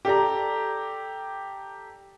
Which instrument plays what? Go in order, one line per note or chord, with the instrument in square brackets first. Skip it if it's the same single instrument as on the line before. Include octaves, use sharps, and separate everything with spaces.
[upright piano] G4 A4 D5 A#5